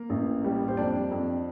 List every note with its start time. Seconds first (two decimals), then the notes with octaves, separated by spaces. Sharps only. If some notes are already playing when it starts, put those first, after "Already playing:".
Already playing: A#3 A#4
0.10 A1
0.44 G3
0.68 C5
0.77 F2 D4 D5
1.11 F2